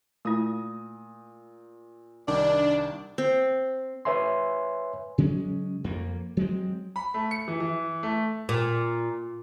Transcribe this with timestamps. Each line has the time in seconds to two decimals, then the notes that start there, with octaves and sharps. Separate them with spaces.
0.25 A#2 A3 E4 D#6
2.28 C2 D#3 D4 D5
3.18 C4
4.05 B4 C#5 E5 G#5 C6
5.18 C#3 F#3 G#3 C#4
5.84 F2 A#3
6.37 F#3 G#3 C4
6.96 B5
7.14 A3
7.31 C#7
7.48 E3
7.60 E3
8.03 A3
8.49 A#2